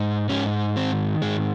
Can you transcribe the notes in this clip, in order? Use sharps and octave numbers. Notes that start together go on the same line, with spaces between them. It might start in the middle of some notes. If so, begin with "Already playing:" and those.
Already playing: G#2
G#2 C#4
D#3 C4
G#2 G#3